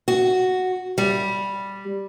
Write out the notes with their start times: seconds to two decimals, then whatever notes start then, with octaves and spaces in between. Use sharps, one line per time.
0.08 F#4
0.98 G3